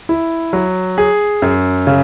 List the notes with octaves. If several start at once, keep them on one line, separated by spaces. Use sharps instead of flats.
E4
F#3
G#4
F#2
C#3